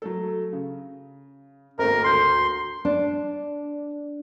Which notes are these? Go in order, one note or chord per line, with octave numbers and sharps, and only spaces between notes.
F#3 A3 A4
C#3
G#1 A3 A#3 A#4
D2 C6 G6
D4